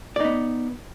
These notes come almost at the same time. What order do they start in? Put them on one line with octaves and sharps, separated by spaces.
D5 D#4 B3